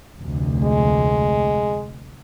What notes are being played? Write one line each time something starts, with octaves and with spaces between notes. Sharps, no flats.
F1 D2
G#3